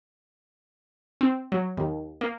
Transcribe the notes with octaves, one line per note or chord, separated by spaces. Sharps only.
C4
F#3
D#2
A#3